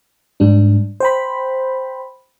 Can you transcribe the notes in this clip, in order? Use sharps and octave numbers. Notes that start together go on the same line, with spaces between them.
G#2 G3 D4
C5 G5 B5